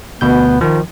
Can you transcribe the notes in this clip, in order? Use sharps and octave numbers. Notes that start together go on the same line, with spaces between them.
D2 B2 B3 G6
D#3 F3